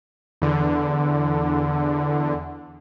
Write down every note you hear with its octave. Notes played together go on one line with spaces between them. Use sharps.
E2 D3